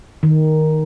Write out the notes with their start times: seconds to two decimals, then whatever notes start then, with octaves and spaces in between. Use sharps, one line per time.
0.23 D#3